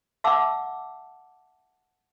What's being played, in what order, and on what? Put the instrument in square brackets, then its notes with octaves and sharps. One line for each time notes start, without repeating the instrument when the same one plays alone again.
[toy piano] E5 F#5 A5 D6 E6